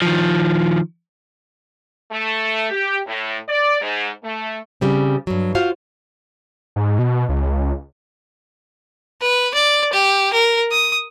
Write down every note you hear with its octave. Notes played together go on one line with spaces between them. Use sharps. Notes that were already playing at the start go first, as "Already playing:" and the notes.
D#3 F3
A3
G4
A2
D5
G#2
A3
C#3 G3 C4
G2 F#3
F4 F#4 C5 F5
G#2
B2
C#2
B4
D5
G4
A#4
D#6